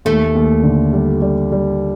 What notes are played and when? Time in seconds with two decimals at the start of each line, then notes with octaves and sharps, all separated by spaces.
0.05 D#2 A3
0.35 D#2
0.63 D3
0.93 G3
1.22 G3
1.52 G3